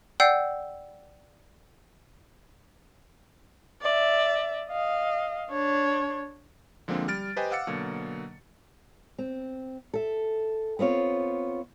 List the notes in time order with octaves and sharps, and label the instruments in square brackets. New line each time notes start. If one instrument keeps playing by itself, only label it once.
[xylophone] D5 F#5 G5 E6 G6 C7
[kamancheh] D5 E5
D#5 F5
D4 C#5
[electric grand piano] D3 F3 G#3 A#3 C4 D4
G3 F6 A6 D7
G4 B4 C5 D#5 G5 G#5
F5 F#5 D6 E6 A6 C#7
B2 D3 F#3 A#3
[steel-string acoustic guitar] C4
A4 E5
B3 C4 F4 C#5